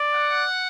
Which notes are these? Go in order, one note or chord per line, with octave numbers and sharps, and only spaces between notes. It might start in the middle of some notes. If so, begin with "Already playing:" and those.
Already playing: D5
F#5